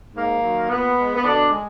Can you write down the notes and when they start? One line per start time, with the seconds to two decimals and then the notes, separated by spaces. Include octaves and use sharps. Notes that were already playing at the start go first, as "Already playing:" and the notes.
0.14 G#2 A#3
0.42 D#3 F#3
0.69 A#2 B3
0.97 G#3
1.15 B3
1.24 B2 D3 D4
1.51 G#3